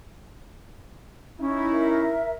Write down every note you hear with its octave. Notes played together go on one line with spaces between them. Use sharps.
C#4 D#4 E4
A#4 E5